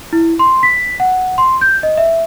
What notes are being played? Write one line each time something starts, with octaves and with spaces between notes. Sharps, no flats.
E4
C6
B6
F#5
C6
G6
D#5
E5